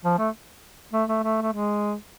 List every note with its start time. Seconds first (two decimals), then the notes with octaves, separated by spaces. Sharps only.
0.05 F3
0.18 A3
0.93 A3
1.09 A3
1.23 A3
1.42 A3
1.53 G#3